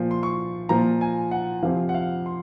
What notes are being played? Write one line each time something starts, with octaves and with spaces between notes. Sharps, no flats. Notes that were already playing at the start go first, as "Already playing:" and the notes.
Already playing: A#2 F3
C6
C#6
A#2 F3 A#5
G#5
F#5
F2 C3 F3 F5
F#5
F5
C6